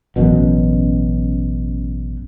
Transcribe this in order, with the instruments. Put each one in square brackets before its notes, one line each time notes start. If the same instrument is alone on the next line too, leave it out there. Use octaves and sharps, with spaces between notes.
[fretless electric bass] A1 F#2 B2